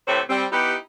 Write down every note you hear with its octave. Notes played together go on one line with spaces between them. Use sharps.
A2 C3 E3 A3 C5 C#5
G3 C4
B3 D#4 E4 G4